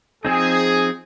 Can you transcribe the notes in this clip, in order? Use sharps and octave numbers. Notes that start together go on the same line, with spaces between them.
F3 C4 D#4 G#4